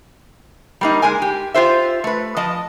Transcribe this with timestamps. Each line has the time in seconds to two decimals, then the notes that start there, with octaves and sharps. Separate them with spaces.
0.81 G3 A#3 D#4
1.02 G#3 A#4 G#5
1.22 G4
1.54 F4 G4 C5 E5
2.04 A3 B4
2.37 F3 D#5 A5